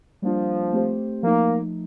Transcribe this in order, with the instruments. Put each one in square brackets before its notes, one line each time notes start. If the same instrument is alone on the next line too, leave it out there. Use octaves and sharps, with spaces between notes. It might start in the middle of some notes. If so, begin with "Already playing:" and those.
[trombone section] F3 [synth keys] G3 A#3 D4 F4
[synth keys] A3 C4 G4 C5
[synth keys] F3 A3 D#4 [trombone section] A#3